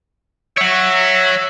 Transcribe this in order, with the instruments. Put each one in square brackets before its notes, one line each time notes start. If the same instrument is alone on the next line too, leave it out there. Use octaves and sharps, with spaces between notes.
[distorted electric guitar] C#5 F#5 [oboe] E5